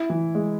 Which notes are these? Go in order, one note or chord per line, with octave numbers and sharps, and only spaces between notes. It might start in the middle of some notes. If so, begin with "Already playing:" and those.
Already playing: E4
E3
G#3